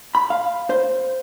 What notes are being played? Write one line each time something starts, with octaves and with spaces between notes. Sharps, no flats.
B5
F5
C5